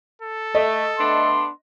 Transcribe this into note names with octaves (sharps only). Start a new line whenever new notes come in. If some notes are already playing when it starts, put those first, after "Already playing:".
A4
A3 D#5
A3 B3 D4 C6